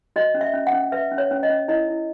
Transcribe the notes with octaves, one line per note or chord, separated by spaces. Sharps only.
F#4 D#5
C#4
E5
C#4
F#5
C#4
B4 E5
C#4
C#5
C#4
D#5
C#4
E4 D#5
E4